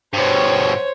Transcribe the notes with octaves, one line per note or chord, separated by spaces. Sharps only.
G2 B2 C5 C#5